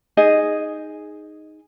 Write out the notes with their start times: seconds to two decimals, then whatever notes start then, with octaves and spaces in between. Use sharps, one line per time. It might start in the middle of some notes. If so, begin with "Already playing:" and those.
0.17 D#4 G#4 D#5